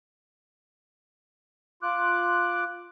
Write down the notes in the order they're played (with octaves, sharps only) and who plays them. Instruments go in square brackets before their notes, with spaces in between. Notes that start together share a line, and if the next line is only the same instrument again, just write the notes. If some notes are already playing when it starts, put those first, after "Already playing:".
[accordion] F4 D6 F#6